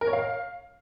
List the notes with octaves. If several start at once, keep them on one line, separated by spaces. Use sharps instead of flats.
A#4
C#5
F5